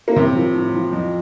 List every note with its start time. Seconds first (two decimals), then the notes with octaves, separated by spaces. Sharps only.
0.08 A#3
0.16 A2 C3 C4
0.35 F3
0.55 A2
0.73 F3
0.93 F2